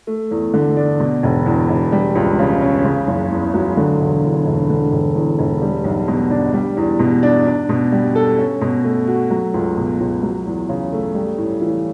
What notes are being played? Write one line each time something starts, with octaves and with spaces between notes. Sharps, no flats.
A3
E2
D3
D4
B2
E1
E2
E1
G3
C#2
C#3
C#4
C#3
F#1
E2
F#3
D3
E1
E2
E1
D3
E1
E2
E1
G3
B1
B2
D4
G3
E2
B2
D4
D4
B2
G3
A4
C#4
B2
A3
F#4
F#3
C#2
B2
C#2
F#3
E2
C#3
A3
G3
A2
E3